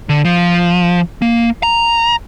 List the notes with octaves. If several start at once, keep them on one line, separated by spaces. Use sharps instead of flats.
D3
F3
A#3
A#5